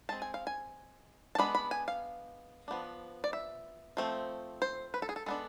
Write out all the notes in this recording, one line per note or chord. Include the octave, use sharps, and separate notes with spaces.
G#3 C4 A5
G#5
F5
G#5
A5
G#3 B3 D4 B5
B5
G#5
F5
F3 B3 D4
D5
E5
F3 A3 C4
C5
B4
A4
G#4
A4
G#3 B3 D4 A4